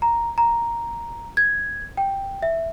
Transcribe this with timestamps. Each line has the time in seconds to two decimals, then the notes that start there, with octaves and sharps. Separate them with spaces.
0.02 A#5
0.38 A#5
1.37 G#6
1.97 G5
2.42 E5